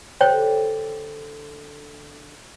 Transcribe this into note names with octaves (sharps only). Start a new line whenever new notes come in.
D3 G4 A4 C5 C#5 G5